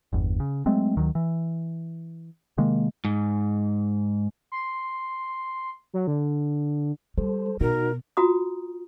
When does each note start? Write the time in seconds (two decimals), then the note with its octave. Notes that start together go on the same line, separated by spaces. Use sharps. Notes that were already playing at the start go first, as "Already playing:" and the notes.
0.13 G1 E2
0.40 C#3
0.66 F#3 G#3 A3 C4
0.96 D2 D#3 F#3
1.15 E3
2.58 C3 D#3 G#3 A#3
3.05 G#2
4.52 C6
5.94 F#3
6.07 D3
7.17 G3 A4 C5
7.60 B2 D#4 F#4 A#4
8.17 F4 F#4 A#5 D#6